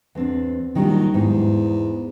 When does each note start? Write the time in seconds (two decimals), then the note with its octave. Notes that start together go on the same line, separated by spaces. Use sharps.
0.15 E2 C4 D4
0.75 A#1 D#3 F#3 G3
1.14 E2 G#2